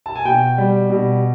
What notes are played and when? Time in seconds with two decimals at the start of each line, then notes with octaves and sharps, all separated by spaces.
0.06 A5
0.16 G#5
0.25 B2 G5
0.58 G3
0.89 B2